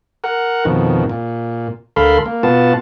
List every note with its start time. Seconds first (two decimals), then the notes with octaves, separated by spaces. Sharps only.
0.24 A#4 F#5
0.65 F2 B2 D#3
1.09 A#2
1.96 D2 A4 A#4 F5 B5 C6
2.26 A#3
2.43 B2 B3 F4 A5